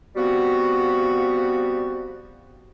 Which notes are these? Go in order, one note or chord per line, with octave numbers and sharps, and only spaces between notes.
F3 G3 B3 C4 F#4